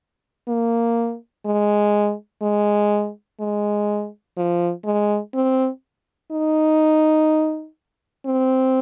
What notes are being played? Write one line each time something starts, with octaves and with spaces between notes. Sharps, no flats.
A#3
G#3
G#3
G#3
F3
G#3
C4
D#4
C4